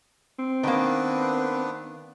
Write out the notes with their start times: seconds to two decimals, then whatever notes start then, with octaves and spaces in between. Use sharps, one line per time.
0.39 C4
0.63 D#3 A#3 B3 D4 B4